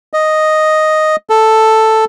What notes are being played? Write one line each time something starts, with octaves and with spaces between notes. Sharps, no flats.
D#5
A4